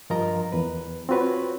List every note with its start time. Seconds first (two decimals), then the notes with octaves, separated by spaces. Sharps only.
0.10 G2 F3 F4 A#4 D#5 A#5
0.52 E2 B4
1.09 C4 F4 F#4 B4 C#5